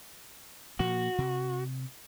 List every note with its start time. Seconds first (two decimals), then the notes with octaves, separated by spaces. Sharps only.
0.79 A#2 F3 A#3 F#4
1.18 C3